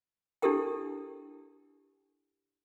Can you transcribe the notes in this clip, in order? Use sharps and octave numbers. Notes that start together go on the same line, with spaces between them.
D4 E4 G4 A4 A#4 G5